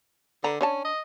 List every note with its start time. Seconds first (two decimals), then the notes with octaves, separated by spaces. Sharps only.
0.44 D3 B4 A#5
0.61 C#4 D4 C#5 A5
0.85 D#5